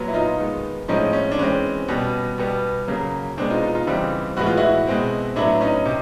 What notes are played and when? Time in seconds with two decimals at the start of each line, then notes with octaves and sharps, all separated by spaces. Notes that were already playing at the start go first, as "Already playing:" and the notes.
Already playing: A#2 F#3 B3
0.08 E4
0.14 D#4 F4
0.38 D#3 G#3 B3
0.88 A2 F3 G#3 C4 C#4 D#4
1.13 C#4
1.31 D4
1.38 E3 G#3 C4 C#4
1.88 B2 G3 B3
2.38 B2 G3 B3
2.88 C#3 F#3 A#3
3.37 B2 G#3 B3 C4 D4
3.50 D#4 F4
3.62 D#4 F4
3.75 D#4 F4
3.87 C#3 E3 G3 C4
4.37 A2 E3 G#3 B3 F#4
4.47 F4
4.57 E4 F#4
4.87 B2 G#3 C4
5.36 A2 F#3 B3 D4 E4
5.61 C#4 D#4
5.85 C3